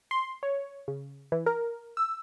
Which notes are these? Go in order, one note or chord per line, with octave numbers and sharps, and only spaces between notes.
C6
C#5
C#3
E3
A#4
E6